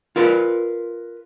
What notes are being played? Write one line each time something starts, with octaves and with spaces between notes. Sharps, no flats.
F4 A#4 B4